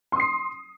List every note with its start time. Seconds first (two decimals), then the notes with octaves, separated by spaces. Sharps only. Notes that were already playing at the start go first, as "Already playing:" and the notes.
0.12 C6
0.16 D#6
0.20 C7